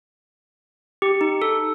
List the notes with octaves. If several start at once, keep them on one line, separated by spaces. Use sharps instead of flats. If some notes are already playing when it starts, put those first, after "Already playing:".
G4
D#4
A4